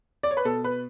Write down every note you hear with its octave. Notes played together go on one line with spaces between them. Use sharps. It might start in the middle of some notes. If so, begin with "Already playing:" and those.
D5
C#5
B4
B2 A4
B4